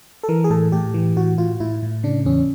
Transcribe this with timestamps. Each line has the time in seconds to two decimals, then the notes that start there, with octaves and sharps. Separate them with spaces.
0.23 A4
0.29 E3 A#4
0.44 G#4
0.50 A2 A4
0.72 A2 G4
0.94 E3
1.16 A2 F#4
1.38 A2 F4
1.60 A2 E4
1.83 A2
2.03 C#3 D4
2.26 E2 C#4